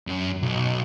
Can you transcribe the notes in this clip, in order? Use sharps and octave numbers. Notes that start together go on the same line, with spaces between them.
F#2
B1